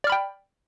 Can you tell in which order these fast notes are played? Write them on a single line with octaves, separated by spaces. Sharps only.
D5 F6 B5 G5